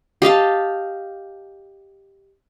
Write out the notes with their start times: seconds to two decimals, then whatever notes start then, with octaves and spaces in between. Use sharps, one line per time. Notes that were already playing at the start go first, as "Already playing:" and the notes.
0.22 G4 D#5 F5 A5